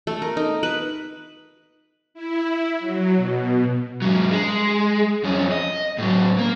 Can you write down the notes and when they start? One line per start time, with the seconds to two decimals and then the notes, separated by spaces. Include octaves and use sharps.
0.07 A3
0.22 A#4
0.37 D#4
0.63 B4
2.14 E4
2.79 F#3
3.16 B2
4.02 G#2 F#3
4.31 G#3
5.24 F2 C#4
5.52 D#5
5.98 A2 F#3
6.39 A#3